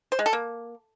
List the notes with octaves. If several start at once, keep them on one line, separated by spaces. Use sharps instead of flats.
C5
G#3
A4
A#3